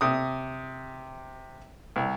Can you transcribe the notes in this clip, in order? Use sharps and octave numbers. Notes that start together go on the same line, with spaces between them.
C3 D#6
C2